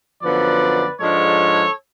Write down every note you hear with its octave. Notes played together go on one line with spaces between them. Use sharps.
F#2 D3 F3 B3 B4 D5
G#2 F3 G#3 D4 A4 C#5